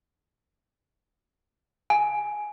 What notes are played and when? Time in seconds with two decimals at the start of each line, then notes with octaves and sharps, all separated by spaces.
1.90 G#5